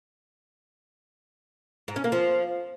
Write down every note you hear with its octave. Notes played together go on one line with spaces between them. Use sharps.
G#2
C#4
A#3
F3